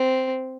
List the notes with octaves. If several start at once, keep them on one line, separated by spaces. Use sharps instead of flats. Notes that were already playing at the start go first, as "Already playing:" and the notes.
Already playing: C4